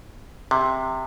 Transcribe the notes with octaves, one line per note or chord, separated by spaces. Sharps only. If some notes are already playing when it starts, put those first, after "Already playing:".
C3